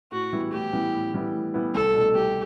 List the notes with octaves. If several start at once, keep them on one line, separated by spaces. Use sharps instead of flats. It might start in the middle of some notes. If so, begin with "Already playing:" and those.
A2 F#4
E3 G3 B3 E4
A2 G4
E3 G3 B3 E4
A2
E3 G3 B3 E4
A2
E3 G3 B3 E4
C2 A4
B2 A3
C2 G4